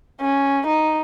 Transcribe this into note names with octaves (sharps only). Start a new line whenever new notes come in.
C#4
D#4